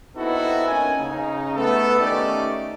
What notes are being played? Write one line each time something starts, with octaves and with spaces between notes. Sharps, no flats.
B3 C4 D#4 E4 F#4 A4
A#3 C#4 D#4 G#5
C#3 D#4
A3 B3 A4
D#3 A3 C#4 D#4 G4 D5